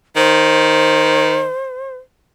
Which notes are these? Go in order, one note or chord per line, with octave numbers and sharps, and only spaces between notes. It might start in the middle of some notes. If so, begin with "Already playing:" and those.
D#3 C5